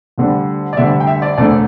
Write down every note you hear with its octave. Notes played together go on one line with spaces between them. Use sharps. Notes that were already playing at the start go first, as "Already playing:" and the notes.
D2 D3 G3
D5
D2 D3 G3 E5
G5
E5
D5
E1 D2 D3 A3 D5